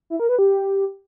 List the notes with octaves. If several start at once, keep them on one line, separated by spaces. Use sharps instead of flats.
E4
A#4
B4
G4